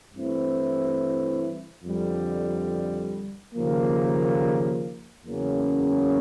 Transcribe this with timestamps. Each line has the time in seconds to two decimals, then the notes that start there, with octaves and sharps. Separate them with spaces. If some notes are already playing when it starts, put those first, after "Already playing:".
0.13 G2 E3 A3 C4 E4
1.84 F2 D3 G3
3.54 D#2 C#3 F3 A#3
5.25 E2 C#3 F#3 A#3 C#4